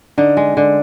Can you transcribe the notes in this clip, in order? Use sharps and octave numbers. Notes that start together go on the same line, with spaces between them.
D3 D#4
G#3
D3